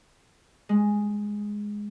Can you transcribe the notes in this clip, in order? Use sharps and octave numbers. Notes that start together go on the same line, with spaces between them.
G#3